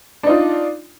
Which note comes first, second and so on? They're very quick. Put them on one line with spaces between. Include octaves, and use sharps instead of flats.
D4 D#4 F4